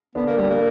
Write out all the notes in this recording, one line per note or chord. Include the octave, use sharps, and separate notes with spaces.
D3 B3 D4
A#3
G3
A#3